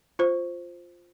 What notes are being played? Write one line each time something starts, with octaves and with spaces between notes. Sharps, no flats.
F4 C5